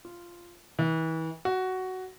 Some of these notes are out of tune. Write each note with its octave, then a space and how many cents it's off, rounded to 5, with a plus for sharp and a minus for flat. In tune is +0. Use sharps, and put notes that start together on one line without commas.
F4 -10
E3 -35
F#4 +10